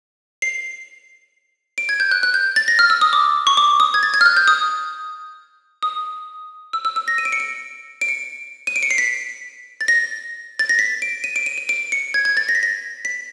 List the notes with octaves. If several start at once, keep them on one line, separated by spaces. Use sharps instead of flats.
C7
D7
G#6
G6
F#6
F#6
G6
A6
A#6
F6
E6
D#6
D6
C#6
D6
D#6
G#6
A6
G#6
F6
F#6
G6
D#6
D#6
E6
E6
E6
A#6
D#7
D7
C#7
D7
D7
C#7
D#7
D7
C#7
C7
B6
A6
A#6
A6
A#6
B6
D7
D#7
D7
D#7
D#7
D7
C#7
G#6
G#6
A6
A#6
B6
A#6
B6